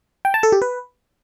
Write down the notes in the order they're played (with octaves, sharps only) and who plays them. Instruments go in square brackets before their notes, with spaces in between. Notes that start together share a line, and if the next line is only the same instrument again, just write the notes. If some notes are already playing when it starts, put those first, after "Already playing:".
[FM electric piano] G5
A5
A4
G4
B4